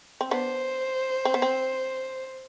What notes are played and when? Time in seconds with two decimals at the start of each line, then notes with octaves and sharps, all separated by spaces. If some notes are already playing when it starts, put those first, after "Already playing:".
0.21 C4
0.31 B3 D4 C5
1.25 C4
1.34 B3
1.42 C4